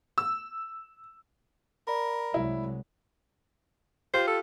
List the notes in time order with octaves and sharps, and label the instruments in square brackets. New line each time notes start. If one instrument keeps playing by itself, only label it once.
[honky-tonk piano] E6
[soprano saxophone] A#4 [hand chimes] D5 B5
[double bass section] C2 F#3 G#3 [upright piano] E4
[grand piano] F4 G4 [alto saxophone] C5
[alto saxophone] A4